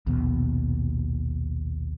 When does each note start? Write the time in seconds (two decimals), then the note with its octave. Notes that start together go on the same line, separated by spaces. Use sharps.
0.07 A#1 D#2 B2